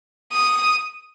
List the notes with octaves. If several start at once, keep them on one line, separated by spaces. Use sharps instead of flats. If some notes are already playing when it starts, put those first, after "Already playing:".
D#6